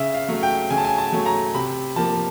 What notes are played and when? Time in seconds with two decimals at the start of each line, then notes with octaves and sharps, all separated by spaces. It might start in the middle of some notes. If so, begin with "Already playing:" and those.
Already playing: C#3 E5
0.14 F5
0.29 F#3 A3
0.43 G5
0.70 C#3 G#5
0.78 A5
0.85 G#5
0.98 A5
1.13 F#3 A3
1.26 A#5
1.55 C3 B5
1.96 F3 A#3 A5